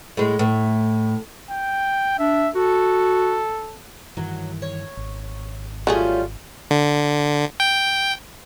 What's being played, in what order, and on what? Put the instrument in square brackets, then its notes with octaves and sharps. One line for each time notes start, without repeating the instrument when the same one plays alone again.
[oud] A2 G#3
A2
[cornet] G5
[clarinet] D4 [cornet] E5
[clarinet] F#4 [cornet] A4
[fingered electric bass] G2 D#3 E3 [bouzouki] F#3
[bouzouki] C#5
[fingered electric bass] G#1
[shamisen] F#3 A3 G#4 [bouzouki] G3 C#4 [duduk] F4
[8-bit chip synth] D3
G5